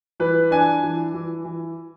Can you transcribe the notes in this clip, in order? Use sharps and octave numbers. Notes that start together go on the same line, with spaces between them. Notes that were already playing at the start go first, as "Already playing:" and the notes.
E3 B4
D4 G#5
E3
E3
E3